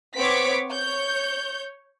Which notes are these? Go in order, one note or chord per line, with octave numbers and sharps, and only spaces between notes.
B3 C4 C#5 D6 B6 D7
C#5 G6